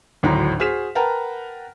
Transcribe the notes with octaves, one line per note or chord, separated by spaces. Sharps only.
G#1 D2 A2 F#3 A#5
F#4 G#4 C5 F6 B6 E7
A#4 B4 F#5 G5 A5 A#5